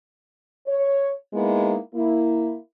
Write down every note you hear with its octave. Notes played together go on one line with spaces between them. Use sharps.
C#5
G#3 A#3 B3 D#4 E4
A#3 E4